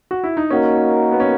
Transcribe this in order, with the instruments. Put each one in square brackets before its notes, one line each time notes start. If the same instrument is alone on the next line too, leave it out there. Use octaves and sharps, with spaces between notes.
[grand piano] F#4
E4
D#4
[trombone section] A#3 D#4 F#4 A#4 [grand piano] C#4
[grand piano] B3
C#4